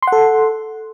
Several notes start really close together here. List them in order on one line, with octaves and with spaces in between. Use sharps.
C6 F#5 A4